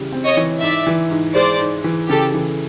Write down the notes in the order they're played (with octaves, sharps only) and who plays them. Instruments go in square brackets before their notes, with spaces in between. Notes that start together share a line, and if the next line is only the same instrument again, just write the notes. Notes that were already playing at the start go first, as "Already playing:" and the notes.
Already playing: [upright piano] C#3 E3 G3
C4
[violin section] C#5 D#5
[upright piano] E3
[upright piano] G#2 [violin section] D5 E5
[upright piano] E3
G#2
[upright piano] G#3 [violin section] C5 D5
[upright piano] G#2
E3
[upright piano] C#3 [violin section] G4 A4
[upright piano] E3